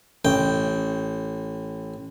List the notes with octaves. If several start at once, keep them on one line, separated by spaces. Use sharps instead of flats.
A1 G5